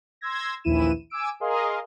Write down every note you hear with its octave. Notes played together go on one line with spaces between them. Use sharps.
C6 E6 G#6 A#6
A#1 D#2 E3 E4 D#7 E7
G#5 D6 E6 D7
G#4 A#4 D#5 F5 C6